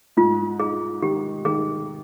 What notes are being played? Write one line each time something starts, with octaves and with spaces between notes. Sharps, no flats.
G#2 F4
D#4 G#4
D#3 G4
D#3 G#4